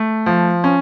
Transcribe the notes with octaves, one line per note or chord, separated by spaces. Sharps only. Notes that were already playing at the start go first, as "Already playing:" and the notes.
Already playing: A3
F3
C#4